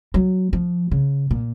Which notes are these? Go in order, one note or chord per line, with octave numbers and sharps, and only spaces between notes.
F#3
F3
C#3
A#2